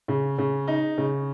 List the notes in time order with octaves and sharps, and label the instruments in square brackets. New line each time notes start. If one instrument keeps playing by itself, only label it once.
[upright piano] C#3
C#3
D#4
C#3